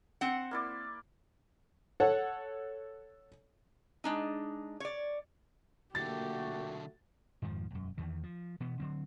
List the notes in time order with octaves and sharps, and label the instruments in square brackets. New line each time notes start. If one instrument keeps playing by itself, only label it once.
[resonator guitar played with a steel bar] C4 F#5
[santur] A#3 E4 D5
[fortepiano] A4 C#5 F#5
[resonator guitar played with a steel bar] G#3 D4 D#4
C#5 D5
[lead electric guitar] B1 D3 [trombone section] A#2 A3 F#4 [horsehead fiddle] A#3 G4 [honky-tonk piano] A6
[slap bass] F2 G#2 D#3 F3
E1 F#2
E2 D#3 E3
F3
B2 E3 B3
D3 F#3 C4